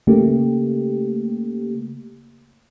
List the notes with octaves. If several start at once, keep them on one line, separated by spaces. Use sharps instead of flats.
C#3 A3 A#3 G4